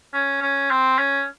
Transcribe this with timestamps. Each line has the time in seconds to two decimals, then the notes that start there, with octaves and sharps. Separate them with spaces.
0.13 C#4
0.41 C#4
0.70 C4
0.98 C#4